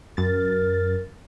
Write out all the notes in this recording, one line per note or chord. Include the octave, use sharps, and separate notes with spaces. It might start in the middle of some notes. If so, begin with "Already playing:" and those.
F#2 A#4 A6